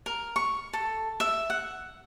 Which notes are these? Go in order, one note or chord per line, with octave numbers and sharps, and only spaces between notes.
A#4
C#6
A4
E5
F#5